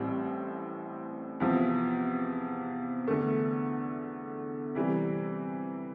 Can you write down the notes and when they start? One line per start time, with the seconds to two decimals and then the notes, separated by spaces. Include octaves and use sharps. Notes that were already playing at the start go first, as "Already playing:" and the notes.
Already playing: A1 A2 G3 C4
1.40 E2 C3 F3
3.08 E2 D3 A3
4.75 C3 E3 G3